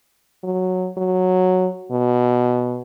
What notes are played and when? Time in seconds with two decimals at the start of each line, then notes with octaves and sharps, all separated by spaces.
0.44 F#3
0.98 F#3
1.92 B2